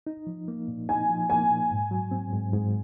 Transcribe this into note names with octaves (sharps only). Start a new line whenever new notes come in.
D#4
F3
A#3
A#2
D#4 G#5
F3
A#3 G#5
A#2
G#2
F#3
C4
G#2
G#2